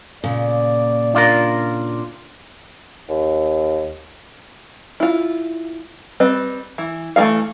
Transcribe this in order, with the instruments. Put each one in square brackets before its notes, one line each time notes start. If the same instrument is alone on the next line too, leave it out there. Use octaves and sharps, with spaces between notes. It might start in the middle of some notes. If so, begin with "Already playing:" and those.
[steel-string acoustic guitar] A#2 C#3 [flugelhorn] D5
[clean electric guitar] D4 F4 A#4
[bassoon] D#2
[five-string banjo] E4 F4
G3 C4 B4 D#5
E3
E3 A3 F#4 G#4 F5